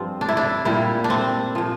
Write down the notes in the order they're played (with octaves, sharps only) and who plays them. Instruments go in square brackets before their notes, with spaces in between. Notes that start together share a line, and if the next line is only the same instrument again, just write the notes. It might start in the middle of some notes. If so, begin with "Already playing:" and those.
Already playing: [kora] G2 F3 C4
D4
E4
D4
A#2 G3 E4
D4
C4
A#2 F3